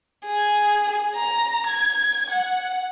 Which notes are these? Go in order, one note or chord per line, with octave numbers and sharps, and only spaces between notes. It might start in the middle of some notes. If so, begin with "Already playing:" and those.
G#4
A#5
G#6
F#5